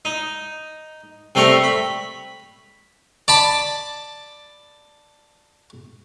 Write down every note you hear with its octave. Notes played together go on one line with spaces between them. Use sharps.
D#4
C3 G3 A3 A#4 A#5 C#6
B5
D5 A5 B5